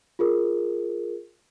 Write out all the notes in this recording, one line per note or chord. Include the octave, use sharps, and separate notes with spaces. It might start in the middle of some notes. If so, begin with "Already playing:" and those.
F4 G#4 A#4